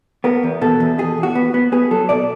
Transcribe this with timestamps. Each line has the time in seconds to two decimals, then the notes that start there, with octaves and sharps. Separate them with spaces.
0.24 B3 A#4
0.43 E2
0.61 B2 A4
0.80 E2
0.98 B2 G#4
1.18 E2
1.23 F#4
1.35 B3
1.54 B3
1.72 B3 G#4
1.91 F#3 A4
2.09 B2 D5